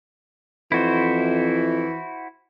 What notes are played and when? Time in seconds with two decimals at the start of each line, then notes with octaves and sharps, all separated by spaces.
0.72 F2 E3 E4 F#4 C5